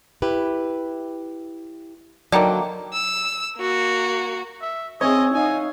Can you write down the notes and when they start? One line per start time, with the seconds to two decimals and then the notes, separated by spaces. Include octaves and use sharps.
0.22 E4 G4 B4
2.32 D3 D#3 F#3 A#3 D5 G5
2.94 E6
3.58 A#3 F#4
4.61 E5
5.01 C4 C#5 D#5 E5 G#5
5.34 D#4 F5 G#5